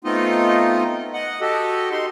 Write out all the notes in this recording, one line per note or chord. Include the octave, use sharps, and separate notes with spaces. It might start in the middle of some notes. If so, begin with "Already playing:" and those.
A3 B3 C4 D#4 F4 D#5
D#5 F#5
F#4 G4 A4 D#5
D#4 C6